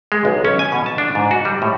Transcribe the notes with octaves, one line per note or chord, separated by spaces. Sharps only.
G#3
B1
C#4
G#5
B2
A5
D4
G#2
F#4
G3
A2